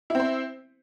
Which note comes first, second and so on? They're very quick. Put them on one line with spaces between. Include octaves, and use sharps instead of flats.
E4 C4 C5